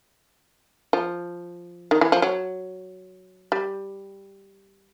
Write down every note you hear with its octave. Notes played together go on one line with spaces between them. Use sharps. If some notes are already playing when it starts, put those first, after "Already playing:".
F3
D#3
E3
F3
F#3
G3